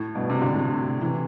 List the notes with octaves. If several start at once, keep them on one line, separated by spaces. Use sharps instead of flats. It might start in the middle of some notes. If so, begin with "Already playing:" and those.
Already playing: A2
G2 B2
C3
D3
A2 C3
C3 E3